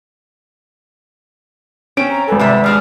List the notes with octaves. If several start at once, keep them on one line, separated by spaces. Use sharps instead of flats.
C4 C#4 D7
A#5
G#1 A4 B4 G#5
C3 G3 D5 E5
F3 G#3 D4 F6